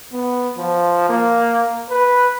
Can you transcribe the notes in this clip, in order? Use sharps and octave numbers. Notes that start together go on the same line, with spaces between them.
B3
F3
A#3
B4